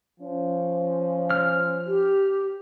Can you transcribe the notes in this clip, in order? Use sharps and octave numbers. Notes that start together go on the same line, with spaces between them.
F3 C#4
F6
G4